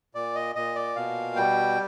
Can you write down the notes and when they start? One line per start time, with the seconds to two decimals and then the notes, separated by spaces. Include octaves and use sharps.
0.15 A#2 D5
0.35 D#5
0.55 A#2 D#5
0.75 D5
0.96 B2 F5
1.36 G3 G5